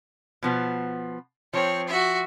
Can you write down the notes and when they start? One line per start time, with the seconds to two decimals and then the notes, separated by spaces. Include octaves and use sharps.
0.43 B2 F3 B3
1.54 F3 C4 C#5
1.88 F#4 E5